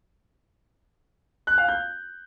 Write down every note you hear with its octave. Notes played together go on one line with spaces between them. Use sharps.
F#6
F5
G6